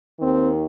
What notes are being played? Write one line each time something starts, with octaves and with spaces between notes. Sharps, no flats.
D#2 D#3 C4